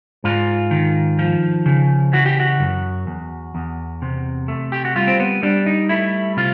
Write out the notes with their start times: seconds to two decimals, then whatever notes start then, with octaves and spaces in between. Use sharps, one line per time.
0.24 G#2 F4
0.71 D#3
1.19 F3
1.66 C#3
2.13 E3 F#4
2.26 G4
2.40 F#4
2.60 F#2
3.07 E2
3.55 E2
4.02 C3
4.48 A3
4.72 G4
4.85 F#4
4.96 G3 F4
5.08 C4
5.20 B3
5.43 G3 D4
5.66 D#4
5.89 A3 E4
6.37 C3 F4